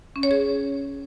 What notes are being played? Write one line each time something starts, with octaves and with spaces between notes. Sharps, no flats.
C#4
C#5
G#4